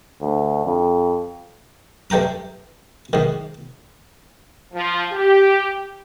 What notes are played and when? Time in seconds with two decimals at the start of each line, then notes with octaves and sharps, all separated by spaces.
0.21 D2
0.65 F2
2.10 G2 A3 G5 A#5 D#6
3.13 G#2 D#3
4.74 F3
5.12 G4